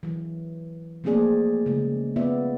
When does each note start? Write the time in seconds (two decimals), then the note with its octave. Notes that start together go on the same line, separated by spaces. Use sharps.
0.03 E3 F#3
1.04 F3 A3 A#3 C4 G#4 D5
1.66 C#3 G#3
2.16 B3 F4 D5 E5